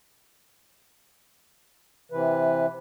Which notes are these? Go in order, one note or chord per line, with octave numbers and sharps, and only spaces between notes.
C3 E3 B4